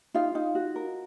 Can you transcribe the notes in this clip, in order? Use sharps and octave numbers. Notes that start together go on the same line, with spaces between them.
D#4 F4 F5
D#4
F#4
A#4